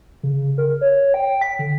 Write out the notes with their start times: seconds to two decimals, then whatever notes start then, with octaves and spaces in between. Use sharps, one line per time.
0.23 C#3
0.58 A#4
0.81 C#5
1.14 G5
1.41 B6
1.59 D3